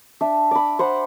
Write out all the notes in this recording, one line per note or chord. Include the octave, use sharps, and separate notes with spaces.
D4 E5
D5 B5
C5 F#5 B5